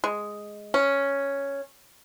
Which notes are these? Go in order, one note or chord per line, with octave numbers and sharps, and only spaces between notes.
G#3
C#4